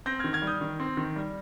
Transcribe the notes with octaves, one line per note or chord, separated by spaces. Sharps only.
C4 G6 A#6
D#3 F6 G#6
F6 G#6
G3
D#6 G6
D#3
C4
D#3
G3